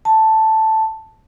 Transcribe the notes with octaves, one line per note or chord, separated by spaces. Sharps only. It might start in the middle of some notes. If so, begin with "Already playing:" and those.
A5